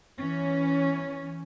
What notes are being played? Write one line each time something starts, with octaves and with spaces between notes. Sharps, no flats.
E3 C#4